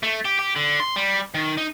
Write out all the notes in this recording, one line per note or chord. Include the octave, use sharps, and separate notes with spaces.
A3
G4
G4
D3
C6
G3
D#3
D#4